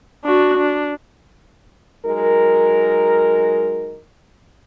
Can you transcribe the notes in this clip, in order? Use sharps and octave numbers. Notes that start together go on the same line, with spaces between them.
D4 F#4
D4
F#3 G#3 D#4 A#4